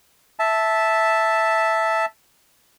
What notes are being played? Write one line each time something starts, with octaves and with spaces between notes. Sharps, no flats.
E5 A5